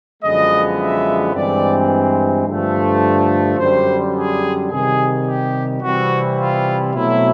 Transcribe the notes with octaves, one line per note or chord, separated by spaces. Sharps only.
F#2 D3 F3 G#3 B3 D#5
E5
G2 E3 G#3 C4 D5
G2 D3 F3 A3
F#2 D3 G3 C5
G#4
C3 D#3 G3 G#4
G4
C3 E3 G3 C4 E4 F#4
F4
B2 F#3 A3 C4 E4